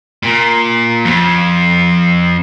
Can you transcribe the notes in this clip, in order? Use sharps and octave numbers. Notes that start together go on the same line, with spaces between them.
A#2
F2